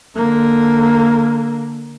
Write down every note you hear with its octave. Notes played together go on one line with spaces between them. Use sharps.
D3 A#3